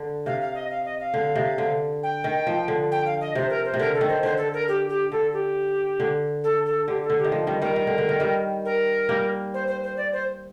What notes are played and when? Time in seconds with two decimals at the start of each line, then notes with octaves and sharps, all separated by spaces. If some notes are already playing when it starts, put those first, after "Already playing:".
Already playing: D3
0.26 C3 F5
0.40 F5
0.55 D#5
0.70 F5
0.85 D#5
1.00 F5
1.14 D3
1.35 C3
1.58 D3
2.03 G5
2.24 D#3
2.47 F3
2.68 D3
2.91 G5
3.06 F5
3.21 D#5
3.35 C3 C5
3.50 A#4
3.65 C5
3.74 C3
3.79 D3 A#4
3.94 A4
4.01 D#3
4.09 C5
4.23 D3 C5
4.37 A4
4.53 A#4
4.68 G4
4.89 G4
5.11 D3 A4
5.33 G4
6.00 D3
6.44 A4
6.65 A4
6.87 D3 G4
7.03 A4
7.10 D3
7.18 G4
7.24 D#3
7.32 F3
7.47 D#3 G3
7.61 D#3 G3 A#4
7.76 D#3
7.87 D3
7.98 D3
8.09 D#3
8.20 D#3 G3
8.65 A#4
9.09 G3 A#3
9.54 C5
9.67 C5
9.83 C5
9.97 D5
10.12 C5